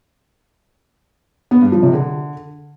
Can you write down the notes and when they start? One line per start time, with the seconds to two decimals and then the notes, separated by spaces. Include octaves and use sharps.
1.51 B3
1.62 G2
1.72 F3
1.83 C3
1.93 D3